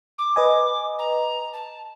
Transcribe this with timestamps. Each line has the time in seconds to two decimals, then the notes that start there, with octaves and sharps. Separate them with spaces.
0.18 D6
0.36 B4 D#5 G#5
0.98 A#5
1.53 A5